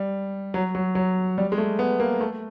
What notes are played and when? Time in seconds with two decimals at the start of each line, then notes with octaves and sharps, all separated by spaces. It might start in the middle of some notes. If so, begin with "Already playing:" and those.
Already playing: G3
0.54 F#3
0.75 F#3
0.95 F#3
1.38 G3
1.52 G#3
1.58 A3
1.79 B3
2.00 A#3
2.21 A3